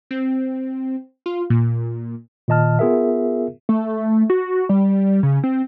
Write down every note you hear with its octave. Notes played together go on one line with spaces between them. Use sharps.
C4
F4
A#2
A#2 D#3 D#5 A5 F6
B3 F4 G#4 A#4 E5
A3
F#4
G3
C#3
C4